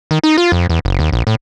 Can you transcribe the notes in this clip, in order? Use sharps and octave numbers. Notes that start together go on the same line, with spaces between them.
D#3
D#4
F4
F2
E2
F#1
D#2
A#1
A2